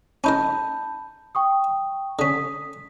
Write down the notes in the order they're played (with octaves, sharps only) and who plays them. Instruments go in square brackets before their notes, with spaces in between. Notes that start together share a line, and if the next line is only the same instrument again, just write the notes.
[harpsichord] C#4 D#4 A#4 [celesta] A5 B5 G6
[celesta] G5 C#6 D#6
[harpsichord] D3 C#4 [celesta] D#6 B6